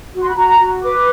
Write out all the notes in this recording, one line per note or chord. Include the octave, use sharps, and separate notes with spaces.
F#4
C6
B5
F#4 A#5
F#4
B4 D6